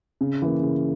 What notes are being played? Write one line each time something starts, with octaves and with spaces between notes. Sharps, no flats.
C#3
E3 A#3
C#3